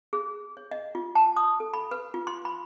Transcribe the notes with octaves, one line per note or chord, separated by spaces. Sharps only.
G#4
C#5
D#5
F4
A5
D#6
A4
B5
B4
F4
C6
B5